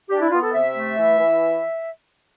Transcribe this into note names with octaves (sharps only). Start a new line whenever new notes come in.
D4 G4
E4
B3 F4
A4
C3 E5
A3
E3
E3